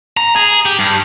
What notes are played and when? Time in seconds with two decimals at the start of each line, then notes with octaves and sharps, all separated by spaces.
0.17 A#5
0.36 G#4
0.65 G4
0.79 G2